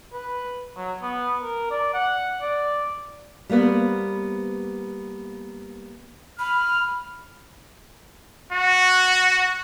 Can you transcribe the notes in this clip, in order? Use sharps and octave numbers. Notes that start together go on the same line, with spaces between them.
B4
F#3
B3
A#4
D5
F#5
D5
G3 A#3 B3 B4 C5
B5 F6
F#4